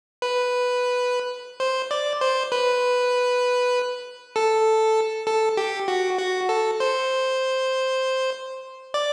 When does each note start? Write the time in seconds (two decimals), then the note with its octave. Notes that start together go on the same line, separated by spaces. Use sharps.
0.22 B4
1.60 C5
1.91 D5
2.21 C5
2.52 B4
4.36 A4
5.27 A4
5.57 G4
5.88 F#4
6.19 F#4
6.49 A4
6.80 C5
8.94 D5